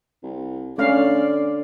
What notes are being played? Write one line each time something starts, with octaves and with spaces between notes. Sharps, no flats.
C2
D3 A3 C#4 D5 F5